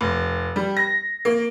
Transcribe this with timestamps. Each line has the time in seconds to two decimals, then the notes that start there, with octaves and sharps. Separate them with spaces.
0.01 F1
0.56 G3
0.77 A#6
1.25 A#3